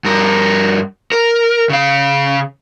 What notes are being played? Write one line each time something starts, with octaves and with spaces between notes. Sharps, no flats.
G2 A#4
A#4
C#3 F5